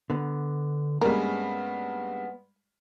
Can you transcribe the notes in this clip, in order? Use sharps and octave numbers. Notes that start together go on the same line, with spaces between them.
D3 B3
G2 G3 G#3 A#3 B3 C#4 A#4